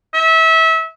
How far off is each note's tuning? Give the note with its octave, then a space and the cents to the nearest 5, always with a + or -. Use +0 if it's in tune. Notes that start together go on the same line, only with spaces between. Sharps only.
E5 -25